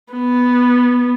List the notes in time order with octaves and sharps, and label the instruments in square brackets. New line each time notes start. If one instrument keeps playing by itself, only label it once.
[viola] B3